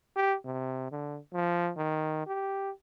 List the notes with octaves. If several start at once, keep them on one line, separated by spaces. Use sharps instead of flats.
G4
C3
D3
F3
D#3
G4